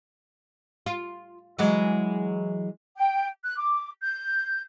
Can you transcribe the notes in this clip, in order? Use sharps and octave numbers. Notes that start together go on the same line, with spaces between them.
F4
E3 F#3 G#3
G5
F#6
D6
G6